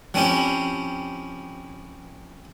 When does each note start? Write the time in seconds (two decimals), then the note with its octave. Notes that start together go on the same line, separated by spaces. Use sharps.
0.14 F3 C4 C#4 E4 G4